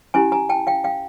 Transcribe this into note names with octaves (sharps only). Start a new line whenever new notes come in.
C#4 E4 G4 G#5 A#5
G#5 A#5
G5 A5
F5 G5
F5 G5